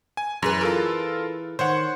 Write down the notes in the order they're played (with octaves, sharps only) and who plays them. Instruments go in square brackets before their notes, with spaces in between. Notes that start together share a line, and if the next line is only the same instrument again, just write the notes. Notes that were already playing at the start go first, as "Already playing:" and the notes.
[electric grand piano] G#5
[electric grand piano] F#2 [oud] E3 G#4 B4
[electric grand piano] F4 A4 A#4
[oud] D#3 [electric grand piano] C5 C#5 F#5